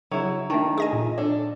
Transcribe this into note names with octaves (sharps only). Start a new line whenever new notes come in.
C#3 F#3 E4
D#3 A3 D4
G#4 D#5 G#5
A#2
D4 A4